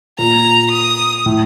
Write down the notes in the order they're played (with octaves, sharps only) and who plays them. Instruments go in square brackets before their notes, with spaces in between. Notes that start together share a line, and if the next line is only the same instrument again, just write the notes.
[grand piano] A#2 [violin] A#5
[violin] D#6
[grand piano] A2